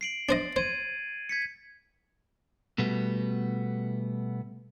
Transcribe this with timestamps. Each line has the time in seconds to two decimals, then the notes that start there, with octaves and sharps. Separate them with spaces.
0.01 C7 D7 F#7
0.29 D4 C5 D#5 A6
0.56 C5 G#6 D#7 F#7
1.29 G#6 B6 C#7
2.78 B2 G3 A3 B3